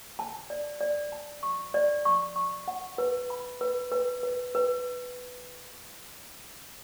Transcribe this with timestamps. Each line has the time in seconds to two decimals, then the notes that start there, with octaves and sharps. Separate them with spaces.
0.19 A5
0.50 D5
0.81 D5
1.12 A5
1.43 C#6
1.74 D5
2.05 C#6
2.36 C#6
2.68 F#5
2.98 B4
3.30 B5
3.61 B4
3.92 B4
4.23 B4
4.55 B4